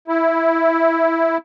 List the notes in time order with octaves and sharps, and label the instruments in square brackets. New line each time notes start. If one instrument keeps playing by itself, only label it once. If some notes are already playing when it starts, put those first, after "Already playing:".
[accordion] E4